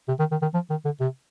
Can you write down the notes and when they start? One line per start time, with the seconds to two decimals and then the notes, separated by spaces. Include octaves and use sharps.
0.08 C3
0.19 D#3
0.31 D#3
0.42 D#3
0.54 F3
0.70 D#3
0.85 D3
1.00 C3